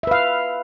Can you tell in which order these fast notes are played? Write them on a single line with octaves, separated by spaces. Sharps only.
E5 B4 F5